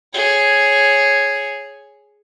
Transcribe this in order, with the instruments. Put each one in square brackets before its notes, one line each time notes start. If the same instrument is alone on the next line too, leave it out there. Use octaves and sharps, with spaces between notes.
[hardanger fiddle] G#4 C#5